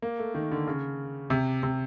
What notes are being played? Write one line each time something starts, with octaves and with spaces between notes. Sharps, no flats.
A#3
A3
D#3
D3
C#3
C3
C3